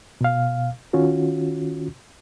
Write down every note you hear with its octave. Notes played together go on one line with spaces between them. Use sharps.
B2 F5
D#3 C#4 F4 F#4